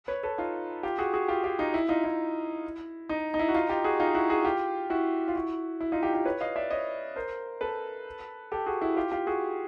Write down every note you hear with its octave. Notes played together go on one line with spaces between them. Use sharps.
B4 C#5
A4 B4
D#4 F4
F4 G4
F#4 G#4
F#4 G#4
F4 G4
F4 G4
D#4 F4
E4
D#4 F4
E4
D#4
D#4
E4
F#4
D#4 F4
F4 G4
F#4 G#4
D#4 F4
E4 F#4
F#4 G#4
F4 G4
E4 F#4
F4
E4 F#4
E4
D#4 F4
F4 G4
F4 G4
B4 C#5
D#5 F5
D5 E5
C#5 D#5
A#4 C5
A4 B4
G4 A4
F#4 G#4
E4 F#4
F4 G4
F4 G4
F#4 G#4